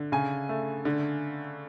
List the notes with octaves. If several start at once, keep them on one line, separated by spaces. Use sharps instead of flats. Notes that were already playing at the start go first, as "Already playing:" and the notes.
Already playing: D3
C#3 G#5
A3
D3